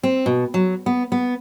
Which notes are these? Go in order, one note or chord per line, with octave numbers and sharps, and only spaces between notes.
C4
B2
F#3
B3
B3